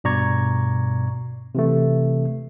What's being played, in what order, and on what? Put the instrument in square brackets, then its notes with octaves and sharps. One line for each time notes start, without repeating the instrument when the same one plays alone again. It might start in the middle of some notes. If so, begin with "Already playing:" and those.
[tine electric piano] G2 B2 D5 A#5 C#6 G#6
C3 E3 A3